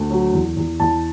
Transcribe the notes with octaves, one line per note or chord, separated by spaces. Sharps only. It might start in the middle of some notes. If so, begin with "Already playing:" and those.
Already playing: D2
F#3
E2
E2
E2 A5